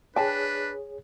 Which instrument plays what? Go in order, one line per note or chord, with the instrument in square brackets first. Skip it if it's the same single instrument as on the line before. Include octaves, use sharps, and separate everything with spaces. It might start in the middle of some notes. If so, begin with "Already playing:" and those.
[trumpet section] D4 B4 [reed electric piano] G#4 C#5 [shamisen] G5 A5